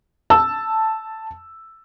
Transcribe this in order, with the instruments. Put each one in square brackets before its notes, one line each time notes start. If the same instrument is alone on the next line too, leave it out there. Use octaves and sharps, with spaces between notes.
[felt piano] A5 E6